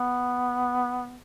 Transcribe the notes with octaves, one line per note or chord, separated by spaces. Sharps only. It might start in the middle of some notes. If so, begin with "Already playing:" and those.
Already playing: B3